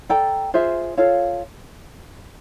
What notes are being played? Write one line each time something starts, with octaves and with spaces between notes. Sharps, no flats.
A4 D5 G5 A#5
F4 G#4 C5 E5
F4 A4 C#5 F5